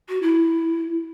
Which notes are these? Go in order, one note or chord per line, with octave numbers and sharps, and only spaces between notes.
F#4
E4